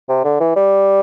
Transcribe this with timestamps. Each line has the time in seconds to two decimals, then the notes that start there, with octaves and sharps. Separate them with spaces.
0.09 C3
0.25 D3
0.40 E3
0.56 G3